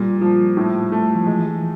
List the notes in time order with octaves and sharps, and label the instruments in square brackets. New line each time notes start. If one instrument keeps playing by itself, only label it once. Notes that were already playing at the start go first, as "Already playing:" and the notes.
Already playing: [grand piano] A#2 [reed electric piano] G3
[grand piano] F3
A2
A3
[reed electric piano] F3
[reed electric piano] E3 [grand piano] G#3